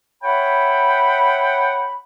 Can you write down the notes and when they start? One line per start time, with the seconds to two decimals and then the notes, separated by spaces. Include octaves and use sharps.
0.22 C#5 E5 F#5 G5 B5